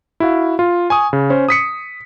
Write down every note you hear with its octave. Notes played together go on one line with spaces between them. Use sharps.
E4 F#4 F5
F4
G#5 C#6 D#6
C#3
C#4 C5
D#6 B6 C#7